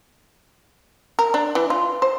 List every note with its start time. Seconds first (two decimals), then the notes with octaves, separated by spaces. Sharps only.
1.19 A#4
1.34 D4
1.55 E3
1.70 F4
2.02 C5